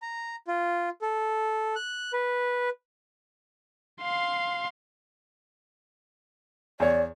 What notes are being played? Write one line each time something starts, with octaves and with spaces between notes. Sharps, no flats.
A#5
F4
A4
F#6
B4
F5 C6
E2 C#5 D5